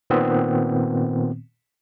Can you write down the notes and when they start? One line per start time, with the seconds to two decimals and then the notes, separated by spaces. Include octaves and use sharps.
0.10 A#2 D#3 B3 C4